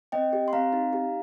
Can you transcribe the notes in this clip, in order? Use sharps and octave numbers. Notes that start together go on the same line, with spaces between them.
C4 D#5 G5
G4
C6
C4 F5 A#5
D#4
G4